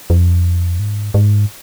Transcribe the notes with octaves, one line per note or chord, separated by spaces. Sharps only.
F2
G#2
G#2